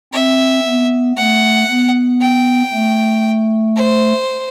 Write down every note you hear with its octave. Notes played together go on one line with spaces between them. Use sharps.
C4 E5
B3
A3 F#5
B3
G5
A3
C5